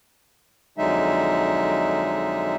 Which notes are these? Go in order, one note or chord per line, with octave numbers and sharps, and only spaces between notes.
F2 D3 F#3 G#3 D#4 E5